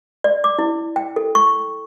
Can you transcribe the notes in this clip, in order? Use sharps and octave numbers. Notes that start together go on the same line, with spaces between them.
D5
D6
E4
G5
A4
C#6